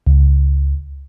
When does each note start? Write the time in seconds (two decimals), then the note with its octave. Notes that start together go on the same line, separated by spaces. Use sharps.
0.07 C#2